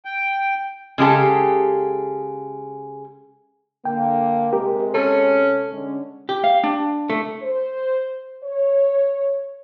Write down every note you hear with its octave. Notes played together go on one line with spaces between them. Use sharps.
G5
C#3 G#3 G4 A4
D3 A#3 G5
C3 G#3 G4 A#4
C#4 A4 A5
D3 G#3 C#4
G4
F5
D4
A3
C5
C#5